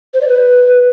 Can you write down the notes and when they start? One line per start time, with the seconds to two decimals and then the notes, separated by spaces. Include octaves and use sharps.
0.13 C5
0.21 D5
0.28 B4